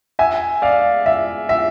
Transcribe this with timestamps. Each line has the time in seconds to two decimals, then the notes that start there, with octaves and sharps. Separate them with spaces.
0.19 E5 G#5
0.62 D5 F5
1.06 E5
1.49 E5